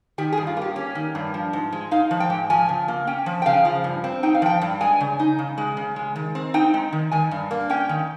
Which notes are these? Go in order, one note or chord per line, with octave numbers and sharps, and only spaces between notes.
D#3 G4
G#4
G2
F4
A#3 G4
C#4
D#3
G2
F3
G#2
G#3
D#4 F5
F3
G5
G#2
F3 G#5
C#3
A#3
C#4 G5
F3
G5
C#3 F5
F3
G2
C4
D#4 G5
F5
F3 G5
G2
G#3 G#5
C#3
D#4
C#3
G#3
C#3
G#3
D#3
C4
D#4 G5
G#3
D#3
D#3 G#5
G2
A#3
C#4 G5
D#3